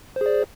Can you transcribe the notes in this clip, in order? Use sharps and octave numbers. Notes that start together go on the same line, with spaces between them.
G#4 C5 D5